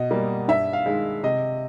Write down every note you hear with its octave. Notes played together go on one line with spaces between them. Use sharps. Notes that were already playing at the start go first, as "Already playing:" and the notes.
Already playing: B2 D#5
G3 A#3
G2 E5
F5
D#3 G#3
C3 D#5